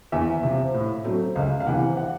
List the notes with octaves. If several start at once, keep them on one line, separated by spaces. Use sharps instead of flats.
E2 E5
C3 F3
A2
F#3 A3 C4
C#2 F5
F5
C3 E3 F#5
F#5